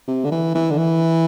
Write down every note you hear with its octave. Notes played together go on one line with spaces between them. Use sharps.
C3
D3
E3
E3
D3
E3